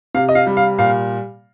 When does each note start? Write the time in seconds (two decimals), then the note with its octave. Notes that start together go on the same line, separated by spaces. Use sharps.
0.15 C3 F5
0.29 D#5
0.35 F5
0.47 G3
0.57 F5
0.78 A#2 F5